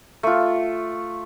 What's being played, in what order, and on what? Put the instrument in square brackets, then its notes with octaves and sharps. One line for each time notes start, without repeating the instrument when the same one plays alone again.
[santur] A3 F4